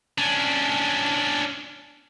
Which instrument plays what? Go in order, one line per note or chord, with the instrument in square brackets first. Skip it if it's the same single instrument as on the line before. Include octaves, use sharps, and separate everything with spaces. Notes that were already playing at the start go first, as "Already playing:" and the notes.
[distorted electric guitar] C#4 D4